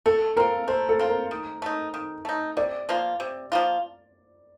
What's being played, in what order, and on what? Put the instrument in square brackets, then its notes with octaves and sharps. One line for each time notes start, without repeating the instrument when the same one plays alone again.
[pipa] A3 [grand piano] A4
[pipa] C4 F4 [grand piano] A#4
[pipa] A3 [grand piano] C5
[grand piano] A4
[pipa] C4 F4
[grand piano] A#4
[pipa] D#3
A3 D#4
D#3
A3 D#4
[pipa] C3 [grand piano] D5
[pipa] F3 A#3 F4
C3
F3 A#3 F4